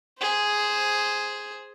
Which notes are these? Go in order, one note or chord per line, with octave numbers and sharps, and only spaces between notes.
G#4 C5